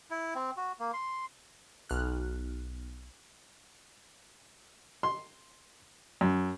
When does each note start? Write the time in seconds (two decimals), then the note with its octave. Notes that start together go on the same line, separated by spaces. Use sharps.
0.10 E4
0.35 C4
0.57 F#4
0.79 A#3
0.93 C6
1.90 B1 F6 F#6
5.03 C6
6.21 F#2